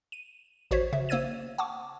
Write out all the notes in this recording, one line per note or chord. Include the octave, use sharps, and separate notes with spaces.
D#7
A1 F#4 C5 C#5 B6
C#3 E5
A#3 C5 E6 G#6 D#7
F#5 A5 C#6 D6